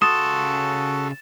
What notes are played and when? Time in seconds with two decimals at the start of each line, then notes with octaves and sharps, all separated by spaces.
0.02 C#3 F#4 A4 C6 D#6 A6 E7